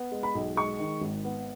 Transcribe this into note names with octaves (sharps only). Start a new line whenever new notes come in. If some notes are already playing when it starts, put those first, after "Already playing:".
Already playing: B3
G#3
B5
B1
G#3 C#6
D#3
G#1
B3